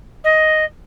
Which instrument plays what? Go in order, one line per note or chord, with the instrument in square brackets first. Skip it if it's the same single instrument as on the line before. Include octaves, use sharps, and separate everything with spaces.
[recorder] D#5